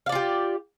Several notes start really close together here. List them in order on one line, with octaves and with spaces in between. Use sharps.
F5 D5 F4 G4